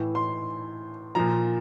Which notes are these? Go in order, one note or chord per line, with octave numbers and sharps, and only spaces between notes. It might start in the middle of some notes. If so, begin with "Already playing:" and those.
Already playing: A2 E3
C6
A#2 F3 A#5